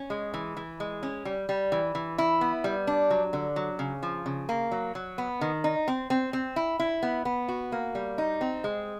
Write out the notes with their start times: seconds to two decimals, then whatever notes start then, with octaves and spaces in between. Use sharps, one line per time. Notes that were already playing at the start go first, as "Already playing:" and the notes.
Already playing: C#4
0.10 G#3
0.34 E3
0.57 E3
0.80 G#3
1.03 C#4
1.25 G3
1.49 G3
1.72 E3
1.95 E3
2.18 E4
2.41 B3
2.64 G3
2.87 D4
3.10 F#3
3.33 D3
3.56 F#3
3.79 C#3
4.03 F3
4.26 C#3
4.49 A#3
4.71 F#3
4.95 F#3
5.18 B3
5.41 D#3
5.64 D#4
5.88 C4
6.10 C4
6.33 C4
6.56 E4
6.79 E4
7.03 B3
7.25 B3
7.48 F#4
7.72 A#3
7.95 G3
8.18 D#4
8.41 C4
8.64 G#3